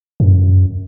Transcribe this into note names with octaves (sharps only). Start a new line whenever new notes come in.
F#2